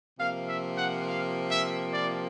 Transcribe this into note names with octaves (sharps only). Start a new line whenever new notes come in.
C3 F3 A#3 F5
E5
F#5
F5
E5
D5